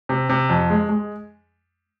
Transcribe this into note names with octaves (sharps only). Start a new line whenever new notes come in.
C3
C3
F2
G#3
G#3